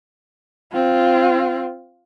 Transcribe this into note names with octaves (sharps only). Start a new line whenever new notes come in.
C4 F4